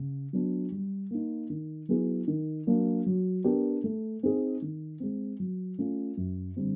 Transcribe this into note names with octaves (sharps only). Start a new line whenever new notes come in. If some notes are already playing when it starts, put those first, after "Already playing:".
Already playing: C#3
F#3 B3 D4
G3
A#3 D#4
D#3
F#3 B3 E4 G#4
D#3
F#3 A#3 D4
F#3
B3 D4 G4 A#4
A3
C4 D#4 G#4
D#3
G#3 C4
F#3
A3 C#4 F4
F#2
D3 G3 C4